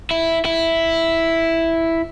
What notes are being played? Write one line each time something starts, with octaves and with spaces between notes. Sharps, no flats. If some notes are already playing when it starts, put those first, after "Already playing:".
E4
E4